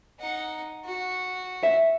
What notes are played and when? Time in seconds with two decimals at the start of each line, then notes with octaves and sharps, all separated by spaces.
0.19 D#4 F#5
0.84 F#4
1.63 E5